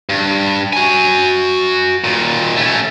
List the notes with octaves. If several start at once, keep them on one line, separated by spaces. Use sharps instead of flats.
G2
F#4 G#5
D#2 A#2
A3 C#4